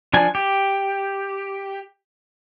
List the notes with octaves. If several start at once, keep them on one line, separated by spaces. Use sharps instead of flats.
F3 D4 G#5
G4